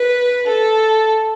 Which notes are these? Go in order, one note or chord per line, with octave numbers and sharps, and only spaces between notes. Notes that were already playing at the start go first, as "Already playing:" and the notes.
Already playing: B4
A4